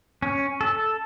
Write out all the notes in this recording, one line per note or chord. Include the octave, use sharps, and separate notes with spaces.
C#4
A4